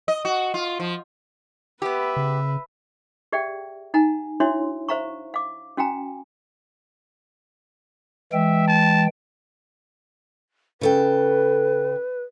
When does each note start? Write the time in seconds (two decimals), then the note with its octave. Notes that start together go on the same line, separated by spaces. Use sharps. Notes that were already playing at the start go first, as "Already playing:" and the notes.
0.08 D#5
0.25 F#4
0.54 F4
0.80 F3
1.82 B3 G4 B4 E5
2.16 C#3
3.32 G4 G#4 D5 E5 F#5 G5
3.94 D#4 F#5 G#5 A#5
4.40 D4 E4 F#4 C#5 E5 C6
4.89 C5 E5 F5 A#5 C#6
5.34 F5 D6
5.77 C#4 F#4 F5 G5 G#5 A#5
8.33 E3 G#3 E5 G5
8.68 A5
10.81 C#3 A4 B4 G5